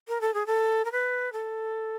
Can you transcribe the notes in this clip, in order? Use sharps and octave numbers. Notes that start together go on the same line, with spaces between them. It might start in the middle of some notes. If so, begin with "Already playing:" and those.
A#4
A4
G#4
A4
A#4
B4
A4